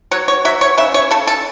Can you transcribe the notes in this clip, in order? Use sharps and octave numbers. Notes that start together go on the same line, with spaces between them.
F#3 C#5
C#5
F#3 E5
C#5
C#3 E5
C#5
C#3 A4
A4